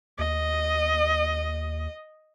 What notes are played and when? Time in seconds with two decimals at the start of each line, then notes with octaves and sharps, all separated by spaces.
0.19 D#2 D#5